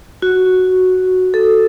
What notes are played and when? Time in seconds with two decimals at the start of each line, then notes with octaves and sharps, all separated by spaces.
0.22 F#4
1.34 A4